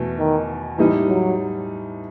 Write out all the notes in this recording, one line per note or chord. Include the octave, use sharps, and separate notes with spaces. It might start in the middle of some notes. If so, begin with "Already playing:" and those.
Already playing: E2 B2 A3
D#3
A2 E3 G3 D#4
F#3